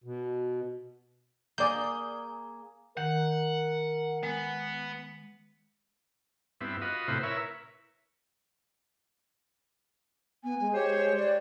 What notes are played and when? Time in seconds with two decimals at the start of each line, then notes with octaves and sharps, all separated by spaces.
0.04 B2
1.58 A#3 G#4 D5 G6
2.97 D#3 A#4 F#5
4.23 G#3 B3
6.61 G2 B3 C4 E4
6.81 F4 F#4 B4 D#5
7.08 A2 C3 E4 B4 C5 F#5
7.23 E4 A#4 B4 C#5 E5
10.44 B3 G#5
10.60 G#3
10.74 G4 C5 C#5
11.17 C#5 D5